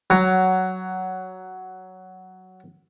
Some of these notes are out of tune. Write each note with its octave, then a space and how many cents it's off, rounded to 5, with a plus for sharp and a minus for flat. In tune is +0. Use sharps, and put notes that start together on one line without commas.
F#3 +10